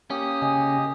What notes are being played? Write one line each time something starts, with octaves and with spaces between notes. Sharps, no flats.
A#3 C#4 G4 D#6
C#3 D#5 G#5